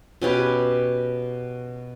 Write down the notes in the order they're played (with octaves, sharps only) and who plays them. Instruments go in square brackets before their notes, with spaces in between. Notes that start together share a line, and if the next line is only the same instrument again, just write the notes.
[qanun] B2 C#4 G4 B4